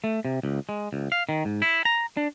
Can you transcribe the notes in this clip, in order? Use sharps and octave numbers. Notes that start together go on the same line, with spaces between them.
A3
C3
C#2
G#3
C#2
F5
D#3
G#2
E4
A#5
D4